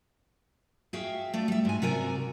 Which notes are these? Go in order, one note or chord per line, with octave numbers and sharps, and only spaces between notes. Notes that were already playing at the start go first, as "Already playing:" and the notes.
F#4 G#4 E5 F5 G5
A3 D5
G3 E5
G#2 G#5
C3 F#4 A#4 D5 G#5